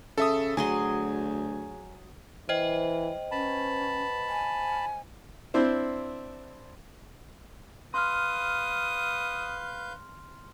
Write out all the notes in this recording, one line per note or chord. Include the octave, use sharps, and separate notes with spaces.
C#3 A4 E5 D#6
D2 F#3 G#4 G#5 C6
E3 C5 D#5 G5
C#4 B4 A5 B5
G#5
C4 D4 E4 C5
B4 F5 C6 D#6 F6 G6